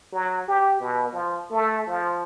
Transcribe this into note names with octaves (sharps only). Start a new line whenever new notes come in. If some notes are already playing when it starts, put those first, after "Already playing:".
F#3
G4
B2
F3
A3
F3